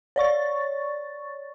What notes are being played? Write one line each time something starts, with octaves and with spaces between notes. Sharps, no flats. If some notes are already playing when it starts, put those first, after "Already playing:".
C#5 D5 C#6 A6